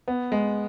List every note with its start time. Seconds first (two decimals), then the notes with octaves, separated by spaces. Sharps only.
0.08 B3
0.32 G#3